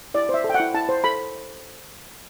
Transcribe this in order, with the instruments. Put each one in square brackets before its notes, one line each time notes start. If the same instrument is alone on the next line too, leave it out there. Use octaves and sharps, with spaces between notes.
[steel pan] E4 D5
C5 E5
A4
G5
F#5
E4
E4 A5
C5
A4 B5